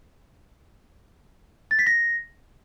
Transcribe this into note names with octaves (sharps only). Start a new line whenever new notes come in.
A6
B6
A#6